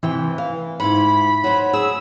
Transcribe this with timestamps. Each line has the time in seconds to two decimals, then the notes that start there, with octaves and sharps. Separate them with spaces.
0.03 C3 E3 G5
0.38 F5
0.80 G#2 E4 B5
1.44 F#3 C5
1.73 G#4 E6